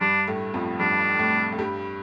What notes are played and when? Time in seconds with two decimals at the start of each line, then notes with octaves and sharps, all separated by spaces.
0.01 G2 G3 D4
0.27 A2 A3
0.54 F2 F3
0.79 G2 G3 D4
1.19 A2 A3
1.52 A3
1.59 G2 G3